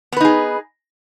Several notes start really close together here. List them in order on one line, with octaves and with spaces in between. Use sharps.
B3 B4 D#4 G#4